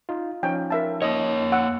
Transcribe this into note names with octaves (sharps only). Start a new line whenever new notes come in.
D#4 F4
F3 C#4 D#4 G5
A#4 E5 A5
A#3 C#5 D#5
F#5 E6